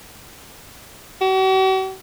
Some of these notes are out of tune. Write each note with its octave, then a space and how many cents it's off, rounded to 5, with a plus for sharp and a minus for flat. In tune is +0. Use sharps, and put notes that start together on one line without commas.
F#4 +45